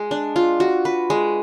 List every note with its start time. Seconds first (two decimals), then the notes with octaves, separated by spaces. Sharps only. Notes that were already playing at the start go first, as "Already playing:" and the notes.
Already playing: G#3
0.11 D4
0.36 F4
0.60 F#4
0.85 B4
1.10 G#3